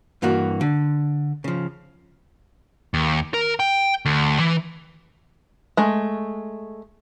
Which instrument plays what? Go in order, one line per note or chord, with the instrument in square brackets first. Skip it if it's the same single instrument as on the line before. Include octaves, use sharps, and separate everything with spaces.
[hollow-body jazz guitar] G2 E3 A#3 F#4
D3
C#3 F3
[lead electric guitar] D#2
A#4
G5
D2
E3
[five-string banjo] G#3 A3